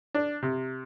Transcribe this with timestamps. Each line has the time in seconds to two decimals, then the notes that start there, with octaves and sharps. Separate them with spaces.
0.14 D4
0.42 C3